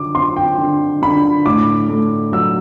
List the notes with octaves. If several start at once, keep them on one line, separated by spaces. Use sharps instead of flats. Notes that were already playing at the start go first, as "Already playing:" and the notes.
Already playing: D3 D6
C4 C6
G5
D3
D3 B5
A2 D6
A3
F#3 E6